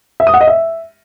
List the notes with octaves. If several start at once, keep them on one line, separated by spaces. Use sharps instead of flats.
E5
D#6
F#5
D#5
E5